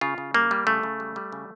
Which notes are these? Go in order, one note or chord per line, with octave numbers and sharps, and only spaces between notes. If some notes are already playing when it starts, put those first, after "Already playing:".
C#3 F4
C#3
G3 A#3
G3
C#3 A3
C#3
G3
G3
C#3